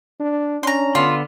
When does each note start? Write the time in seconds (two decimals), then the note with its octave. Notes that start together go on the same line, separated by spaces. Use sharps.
0.20 D4
0.63 C#4 D4 A#5 C6
0.95 D3 B3 F4